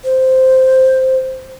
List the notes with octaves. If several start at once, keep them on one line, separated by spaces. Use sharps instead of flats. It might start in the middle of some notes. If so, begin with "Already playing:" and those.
C5